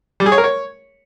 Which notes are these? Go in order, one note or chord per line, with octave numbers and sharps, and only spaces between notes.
G3
G#4
C#5
A#4
C#5